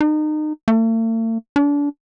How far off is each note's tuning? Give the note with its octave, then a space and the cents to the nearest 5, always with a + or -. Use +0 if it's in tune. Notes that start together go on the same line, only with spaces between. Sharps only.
D#4 -30
A3 +45
D4 -30